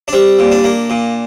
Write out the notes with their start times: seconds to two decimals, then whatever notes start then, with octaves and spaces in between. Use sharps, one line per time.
0.08 D4
0.13 G3 C4
0.39 A#2
0.51 D4
0.64 A#3
0.90 A#2